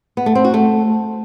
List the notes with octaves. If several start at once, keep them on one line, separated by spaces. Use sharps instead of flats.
B3
A3
C4
F#4
A3